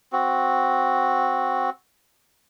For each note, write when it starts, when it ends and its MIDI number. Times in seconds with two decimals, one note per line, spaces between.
0.13 1.70 60
0.13 1.70 66